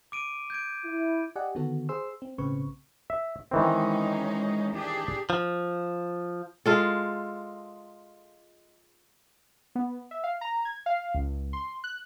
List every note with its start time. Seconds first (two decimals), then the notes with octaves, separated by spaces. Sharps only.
0.12 D6 D7 D#7
0.50 G6 G#6 D7
0.84 E4
1.36 G4 D5 D#5 F#5 G#5
1.55 D3 D#3 B3 F#4 A4
1.89 G#4 C5 C6 E6
2.22 C4
2.38 B1 A2 C#3 C4 B4 C#6
3.10 E5
3.51 D#3 E3 G#3 C4 C#4 D#4
4.73 D4 G4 G#4
5.30 F3
6.66 G#3 F4 A4
9.75 B3
10.11 E5
10.24 F5
10.41 A#5
10.65 G#6
10.86 F5
11.14 C#2
11.53 C6
11.84 F#6